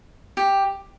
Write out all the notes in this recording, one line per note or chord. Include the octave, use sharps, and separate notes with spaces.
G4